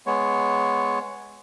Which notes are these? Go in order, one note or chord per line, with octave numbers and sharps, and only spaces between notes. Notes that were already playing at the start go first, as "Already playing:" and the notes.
G#3 B3 C#5